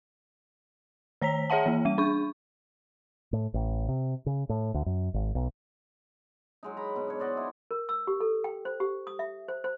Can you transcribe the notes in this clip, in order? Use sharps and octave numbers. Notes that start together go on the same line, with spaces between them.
D#3 C#5 A#5 B6
G#4 C#5 E5 F#5 A5
E3 A#3
G3 D#7
D4 C#6
A2
A1
C3
C#3
A2
D2
F#2
G#1
B1
F#3 G#3 D#4
A#5 B5
B2
D4 C#5
C5 D5 D#5 F#5
D#4 E4
A#4
E6
G4
A4
G5
C5
G4
D#6
E5
C5
C5